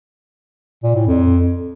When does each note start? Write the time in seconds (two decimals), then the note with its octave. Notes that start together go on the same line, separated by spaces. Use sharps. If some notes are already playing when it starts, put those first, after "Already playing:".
0.83 A#2
0.95 A2
1.07 F2